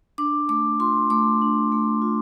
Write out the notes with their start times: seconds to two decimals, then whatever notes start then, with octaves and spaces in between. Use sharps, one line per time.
0.18 D4 D6
0.49 A3 D6
0.79 F4 C6
1.10 A3 D6
1.42 D4
1.72 A3
2.02 F4